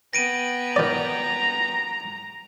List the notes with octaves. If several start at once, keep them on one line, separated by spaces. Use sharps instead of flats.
B3 G5 A#6 D7 D#7
D#3 D5 A#5